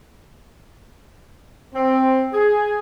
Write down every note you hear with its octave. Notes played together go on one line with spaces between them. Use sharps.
C4
G#4